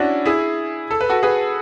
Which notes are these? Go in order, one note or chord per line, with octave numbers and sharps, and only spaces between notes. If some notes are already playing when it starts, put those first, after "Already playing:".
Already playing: C#4 D4 E4 F#4
E4 G#4
A4
B4
F#4 A4
G#4 B4